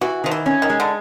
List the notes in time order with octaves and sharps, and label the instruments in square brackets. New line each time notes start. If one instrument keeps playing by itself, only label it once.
[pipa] E3 [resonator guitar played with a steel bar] F#4
[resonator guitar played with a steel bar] D#3 [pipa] F3
[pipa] E3
[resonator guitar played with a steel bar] C#4
[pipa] D#3
[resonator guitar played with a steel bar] G#3
[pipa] D3